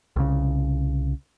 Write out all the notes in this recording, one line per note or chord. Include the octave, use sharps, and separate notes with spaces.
C2 C#3